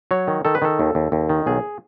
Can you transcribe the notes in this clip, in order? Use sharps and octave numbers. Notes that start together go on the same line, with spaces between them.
F#3 C#5
D#3
D#3 A4
B4
D#3 A4
D#2
D#2
D#2
D#3
B1 G#4